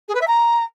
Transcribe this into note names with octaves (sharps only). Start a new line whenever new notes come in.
G#4
B4
E5
A#5